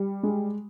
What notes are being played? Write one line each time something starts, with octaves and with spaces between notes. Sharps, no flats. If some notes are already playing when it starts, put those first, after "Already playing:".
Already playing: G3
G#3